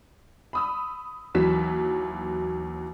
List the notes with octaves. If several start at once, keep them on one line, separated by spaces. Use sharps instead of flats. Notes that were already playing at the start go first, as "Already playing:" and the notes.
B5 D#6 E6
D#2 E3 F#3 B6 E7